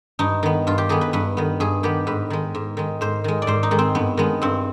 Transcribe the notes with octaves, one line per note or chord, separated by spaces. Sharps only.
G2 D#4
D#3 B3
G2 F4
G4
D#3 B3 G#4
B4
G2 B4
D#3 B3
G2 G#4
D#3 B3 G4
G#2 B4
D#3 G#3
G#2
D#3 G#3
G#2 C5
D#3 G#3
D5
G#2 C5
D#4
D#3 G#3
C4
G2 B3
D#3 G#3 B3
G2 C4